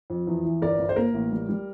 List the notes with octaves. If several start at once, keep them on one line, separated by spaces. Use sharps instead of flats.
F2
E2
E3
G1 A#4 D5
G1
C5
A#3 A#4
A1
G3
G3